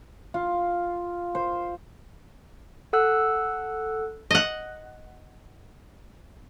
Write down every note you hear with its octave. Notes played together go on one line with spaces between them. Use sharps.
F4
C5
A4 F#5 E6 F#6
D#5 F#5